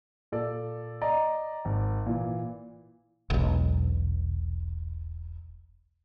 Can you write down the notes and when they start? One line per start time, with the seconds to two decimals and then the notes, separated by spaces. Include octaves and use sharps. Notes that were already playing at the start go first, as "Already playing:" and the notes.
0.32 A#2 A4 D5
1.01 D5 D#5 A#5
1.65 G#1
2.06 A#2 E3
3.30 E1 B1